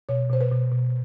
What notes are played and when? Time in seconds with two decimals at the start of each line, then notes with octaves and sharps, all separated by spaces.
0.09 B2 C#5
0.29 B2 C5
0.41 B4
0.51 B2
0.72 B2